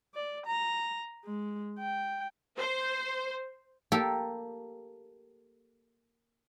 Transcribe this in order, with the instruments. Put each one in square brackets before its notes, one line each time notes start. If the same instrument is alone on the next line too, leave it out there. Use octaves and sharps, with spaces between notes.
[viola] D5
A#5
G#3
G5
[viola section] C5
[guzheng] A#3 G4 A4